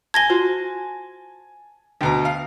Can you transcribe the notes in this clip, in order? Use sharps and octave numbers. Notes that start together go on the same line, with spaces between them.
G#5 A5 G#6 A#6 G7
F4 F#4 C5
D2 B2 G5 A#5
F5